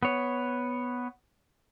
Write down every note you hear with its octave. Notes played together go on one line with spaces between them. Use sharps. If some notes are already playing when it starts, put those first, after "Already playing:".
B3 C#5